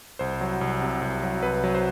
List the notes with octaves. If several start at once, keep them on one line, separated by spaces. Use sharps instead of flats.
C2 C5
F#3
C2
C3
C2
F#3
C2 B4
F#3
C5